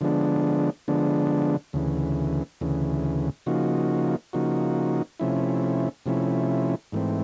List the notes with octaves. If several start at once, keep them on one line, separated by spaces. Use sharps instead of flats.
D3 F3 G#3 B3 D4
D3 F3 G#3 B3 D4
D2 C#3 E3
D2 C#3 E3
C#3 F3 A#3 D#4 F#4
C#3 F3 A#3 D#4 F#4
C3 F3 A3 C#4 E4
C3 F3 A3 C#4 E4
G#2 E3 A3 C4